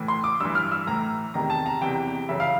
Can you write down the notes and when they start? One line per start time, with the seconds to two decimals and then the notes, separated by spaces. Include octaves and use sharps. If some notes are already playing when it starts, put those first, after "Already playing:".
Already playing: A2 E3
0.08 C6
0.24 D6
0.40 G2 E3 E6
0.55 F6
0.72 E6
0.87 A2 E3 A#5
1.34 E2 C3 D#3 A#5
1.50 A5
1.66 A#5
1.81 E2 C3 E3 G5
2.29 F#2 C#3 E3 E5
2.40 F5